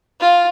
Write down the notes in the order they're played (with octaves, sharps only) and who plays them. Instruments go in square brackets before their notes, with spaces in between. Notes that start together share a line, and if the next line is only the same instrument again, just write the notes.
[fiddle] F4